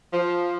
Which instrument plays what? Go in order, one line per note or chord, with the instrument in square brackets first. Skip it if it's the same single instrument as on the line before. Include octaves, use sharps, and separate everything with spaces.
[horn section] F3